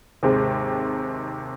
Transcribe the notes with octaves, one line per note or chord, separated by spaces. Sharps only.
D#2 G#2 C3 C5